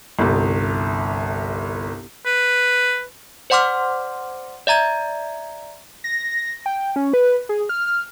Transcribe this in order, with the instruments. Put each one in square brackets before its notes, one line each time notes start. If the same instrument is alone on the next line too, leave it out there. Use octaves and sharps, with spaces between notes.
[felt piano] G1 C2
[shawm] B4
[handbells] C5 D5 F#5 C6 D6 F6
D5 E5 A#5 G#6
[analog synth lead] A#6
G5
C#4
B4
G#4
F6